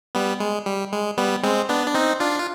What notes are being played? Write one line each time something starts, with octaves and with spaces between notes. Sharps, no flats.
G3 B3
G#3
G3
G#3
G3 B3
G#3 C4
B3 D4
D4
C4 D#4
D4 F4
F4